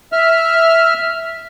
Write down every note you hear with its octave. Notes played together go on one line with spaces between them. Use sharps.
E5 F6